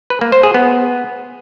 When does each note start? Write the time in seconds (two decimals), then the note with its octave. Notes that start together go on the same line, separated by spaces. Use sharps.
0.10 B4
0.21 A#3
0.32 C5
0.43 G#4
0.54 B3